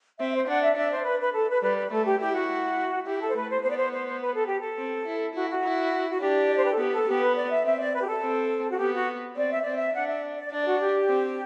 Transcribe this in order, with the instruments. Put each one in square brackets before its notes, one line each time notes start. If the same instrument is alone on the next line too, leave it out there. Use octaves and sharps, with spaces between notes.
[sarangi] C4 [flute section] E5
[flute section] C5
[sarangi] D4 [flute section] F#5
[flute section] E5
[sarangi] D4 [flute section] E5
[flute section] C5
B4
B4
A4
B4
[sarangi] G3 [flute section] B4
[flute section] B4
[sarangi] A3 [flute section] A4
[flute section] G4
[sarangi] E4 [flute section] G4
[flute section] F#4
[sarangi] E4 [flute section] G4
[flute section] A4
C5
[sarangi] A3 [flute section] B4
[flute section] C5
[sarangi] B3 [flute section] C5
[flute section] D5
C5
C5
C5
B4
A4
G4
A4
[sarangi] C4
E4
[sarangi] E4 [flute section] F#4
[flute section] F#4
[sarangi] E4
[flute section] F#4
[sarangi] D4 [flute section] G4
[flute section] D5
C5
B4
A4
[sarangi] B3 [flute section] G4
[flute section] A4
[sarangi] B3 [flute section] G4
[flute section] B4
D5
E5
[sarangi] C4 [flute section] E5
[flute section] D5
B4
G4
A4
[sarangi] C4
[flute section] F#4
[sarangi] B3 [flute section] G4
[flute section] F#4
[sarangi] C4 [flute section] D5
[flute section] E5
[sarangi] C4 [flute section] D5
[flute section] E5
[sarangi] D4 [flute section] F#5
[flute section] E5
D5
[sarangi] D4 [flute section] D5
[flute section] F#4
G4
[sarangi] C4